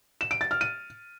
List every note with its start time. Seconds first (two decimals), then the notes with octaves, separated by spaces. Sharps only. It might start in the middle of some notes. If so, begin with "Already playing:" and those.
0.21 E7
0.31 D7
0.41 A6
0.51 F6
0.61 D#7